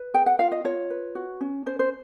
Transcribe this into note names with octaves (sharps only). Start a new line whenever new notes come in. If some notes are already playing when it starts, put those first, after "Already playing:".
Already playing: B4
G#4 G5
F#5
F4 F5
D#5
F4 C#5
B4
F#4
C#4
C#4 C5
C5